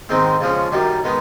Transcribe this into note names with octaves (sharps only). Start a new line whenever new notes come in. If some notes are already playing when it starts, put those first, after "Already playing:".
G#2 D#3 G#3 C4
C#3 F3 G#3 C#4
F#2 D#3 G3
D#3 G#3 B3